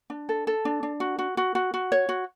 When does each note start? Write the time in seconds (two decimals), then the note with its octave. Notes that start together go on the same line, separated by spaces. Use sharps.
0.10 D4
0.29 A4
0.47 A4
0.65 D4
0.83 D4
1.00 F#4
1.19 F#4
1.37 F#4
1.55 F#4
1.74 F#4
1.92 C#5
2.09 F#4